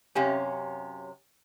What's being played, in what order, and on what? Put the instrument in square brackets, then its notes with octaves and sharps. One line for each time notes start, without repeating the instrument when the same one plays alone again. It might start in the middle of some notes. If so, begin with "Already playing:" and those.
[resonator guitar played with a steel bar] F#2 C3 C#4 [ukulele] G4 [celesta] C#5 F5 G#5